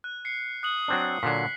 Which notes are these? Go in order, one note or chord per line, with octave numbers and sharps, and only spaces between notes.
F#6
C7 C#7
D#6 F#6 F#7
F#3 C4 D4
A#2 D3 F#3 B6 C7